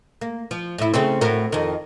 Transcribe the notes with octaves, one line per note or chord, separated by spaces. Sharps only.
A#3
F3
A2 E4
C#3 A3 C4
A2 F#4 A#4
F2 D#3